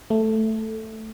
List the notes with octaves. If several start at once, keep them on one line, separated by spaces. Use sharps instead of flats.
A3